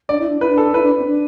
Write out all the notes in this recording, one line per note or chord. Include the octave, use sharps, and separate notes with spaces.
D4 D5
E4
D4
E4 B4
D4
A4
E4 B4
D4
C4
D4